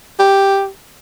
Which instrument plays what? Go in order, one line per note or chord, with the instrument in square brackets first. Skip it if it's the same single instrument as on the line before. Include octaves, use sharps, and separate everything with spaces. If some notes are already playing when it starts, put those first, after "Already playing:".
[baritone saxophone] G4